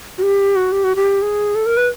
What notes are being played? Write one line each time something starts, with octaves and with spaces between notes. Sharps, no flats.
F#4
G4
F#4
G4
F#4
G4
G#4
A4
A#4
B4